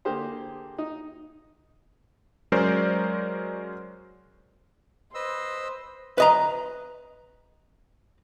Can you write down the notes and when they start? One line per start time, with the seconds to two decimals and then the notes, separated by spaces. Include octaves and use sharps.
0.05 D3 A#3 G4 G#4 C5
0.78 D#4
2.52 F#3 G#3 C#4 A#4 C5 D5
5.15 B4 C5 D#5 E6
6.18 B4 D#5 A#5